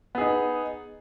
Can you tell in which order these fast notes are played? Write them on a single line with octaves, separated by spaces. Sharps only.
B3 G#4 D#4